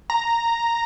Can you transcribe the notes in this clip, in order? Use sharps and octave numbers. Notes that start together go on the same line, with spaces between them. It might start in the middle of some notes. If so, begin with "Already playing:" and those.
A#5